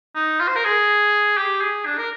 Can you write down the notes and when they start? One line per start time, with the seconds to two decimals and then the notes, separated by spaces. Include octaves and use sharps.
0.15 D#4
0.40 F4
0.48 C5
0.56 A#4
0.64 G#4
1.37 G4
1.61 G#4
1.86 D4
1.98 A#4